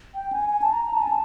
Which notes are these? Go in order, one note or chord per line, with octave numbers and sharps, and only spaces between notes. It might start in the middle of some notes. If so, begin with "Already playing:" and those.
G5
G#5
G#5
A5
A#5
A#5
A5
G#5
A5